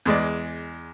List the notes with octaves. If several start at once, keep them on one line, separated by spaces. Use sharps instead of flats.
E2 G#3 D5